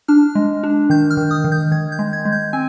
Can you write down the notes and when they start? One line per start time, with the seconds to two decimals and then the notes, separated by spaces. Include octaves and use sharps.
0.08 D4 F6
0.35 G#3
0.63 D4
0.90 D#3 G6
1.11 F6
1.17 D#3
1.31 D#6
1.44 D#3
1.52 G6
1.72 D#3 G#6
1.92 G6
1.99 G#3
2.13 G#6
2.25 G#3
2.32 G6
2.53 C4 G#5